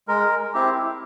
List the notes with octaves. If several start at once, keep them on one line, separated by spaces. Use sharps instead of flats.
G#3 A#4
C4 E4 G4